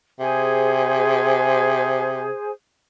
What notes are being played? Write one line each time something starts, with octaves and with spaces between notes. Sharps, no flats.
C3 G#4 C5